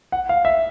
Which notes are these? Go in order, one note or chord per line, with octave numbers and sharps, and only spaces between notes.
F#5
F5
E5